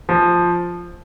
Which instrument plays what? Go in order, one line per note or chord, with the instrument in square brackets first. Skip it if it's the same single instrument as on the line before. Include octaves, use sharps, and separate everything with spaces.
[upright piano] F3